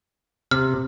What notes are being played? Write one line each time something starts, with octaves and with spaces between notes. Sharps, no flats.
C3 F6